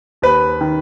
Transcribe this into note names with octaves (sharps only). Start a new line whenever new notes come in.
D#2 B4
D#3